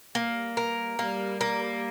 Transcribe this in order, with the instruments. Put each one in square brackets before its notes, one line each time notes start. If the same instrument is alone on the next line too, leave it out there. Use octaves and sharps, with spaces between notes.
[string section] G3 [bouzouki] A#3
[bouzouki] A#4
[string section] G3 [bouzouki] A#3
[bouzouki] A#3